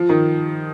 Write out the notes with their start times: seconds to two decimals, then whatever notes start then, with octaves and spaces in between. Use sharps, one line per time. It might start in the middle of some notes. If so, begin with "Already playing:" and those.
Already playing: F3
0.09 D#3